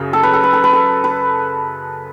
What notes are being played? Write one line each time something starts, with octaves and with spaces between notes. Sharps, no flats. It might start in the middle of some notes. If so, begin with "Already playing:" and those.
Already playing: F#2 C#3
A4
B4
A4
B4
A4
B4
A4
B4